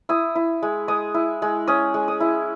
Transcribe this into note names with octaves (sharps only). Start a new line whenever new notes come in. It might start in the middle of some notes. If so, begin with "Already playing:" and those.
E4 D#6
E4
G#3
G#3 D#6
E4
G#3
C#4 D#6
G#3
D#6
E4